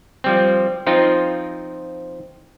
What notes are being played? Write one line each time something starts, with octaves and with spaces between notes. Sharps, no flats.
F3 G3 C4
F3 C4 D#4 F4